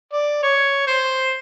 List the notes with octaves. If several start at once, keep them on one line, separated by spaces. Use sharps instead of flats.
D5
C#5
C5